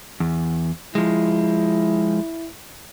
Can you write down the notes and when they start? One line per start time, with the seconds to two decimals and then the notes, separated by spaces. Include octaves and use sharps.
0.20 E2
0.95 F3 G#3 E4